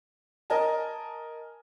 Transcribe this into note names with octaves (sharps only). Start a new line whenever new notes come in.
A#4 D#5 G#5 A5